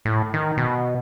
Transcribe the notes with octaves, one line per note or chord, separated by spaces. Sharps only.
A2
D#3
B2